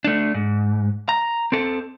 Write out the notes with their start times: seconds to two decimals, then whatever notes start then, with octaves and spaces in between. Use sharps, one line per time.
0.04 A3 D4
0.34 G#2
1.09 A#5
1.52 C4 A4